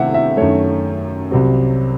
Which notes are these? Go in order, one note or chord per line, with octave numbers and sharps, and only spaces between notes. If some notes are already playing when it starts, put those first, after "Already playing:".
Already playing: C3 D#3 A3 C4 E4 E5 F#5
E5
F#2 D#3 A3 C#5
C2 C3 F#3 C4